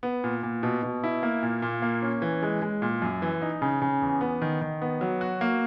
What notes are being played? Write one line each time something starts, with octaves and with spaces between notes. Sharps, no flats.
B3
A#2
A#2
B2
B2
E4
A#3
A#2
A#2
A#3
C#4
E3
G#3
G#3
A#2
F#2
E3
D#4
C#3
C#3
E2
B3
D#3
D#3
B3
F#3
F#4
A#3